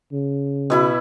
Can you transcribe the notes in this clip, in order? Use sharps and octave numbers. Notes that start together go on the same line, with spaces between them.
C#3
B2 E4 B5